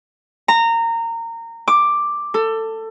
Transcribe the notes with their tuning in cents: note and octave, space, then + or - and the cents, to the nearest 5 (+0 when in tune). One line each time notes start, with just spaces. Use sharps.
A#5 -20
D6 +5
A4 +20